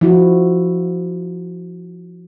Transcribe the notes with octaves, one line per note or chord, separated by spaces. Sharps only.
F3 E4 F#4